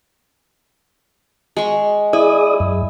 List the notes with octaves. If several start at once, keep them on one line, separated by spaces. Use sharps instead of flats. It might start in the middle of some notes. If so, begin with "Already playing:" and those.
G#3 C#6
E4 G#4 D5 D#6
F#2